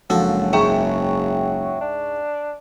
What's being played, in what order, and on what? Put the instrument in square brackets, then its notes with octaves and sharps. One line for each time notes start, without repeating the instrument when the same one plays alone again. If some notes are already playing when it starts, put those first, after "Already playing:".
[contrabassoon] F#1 [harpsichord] F3 F#4 A4 [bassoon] F#3 [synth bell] G#3
[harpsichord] C#2 G#2 [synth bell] E5 G5 C#6
[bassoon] D4